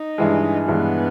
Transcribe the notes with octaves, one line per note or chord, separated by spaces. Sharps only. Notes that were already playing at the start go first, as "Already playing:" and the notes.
Already playing: D#4
G2 E3 G#3
G2 E3 G#3 B3